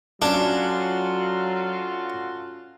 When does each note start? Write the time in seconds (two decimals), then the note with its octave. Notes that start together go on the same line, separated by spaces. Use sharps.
0.22 F#3 C#4 D4 F4 F#4 A4